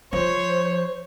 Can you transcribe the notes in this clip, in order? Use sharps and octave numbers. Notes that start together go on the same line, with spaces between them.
F3 C5 C#5